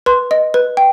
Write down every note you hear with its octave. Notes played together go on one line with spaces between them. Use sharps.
B4 C6
D#5
B4
G5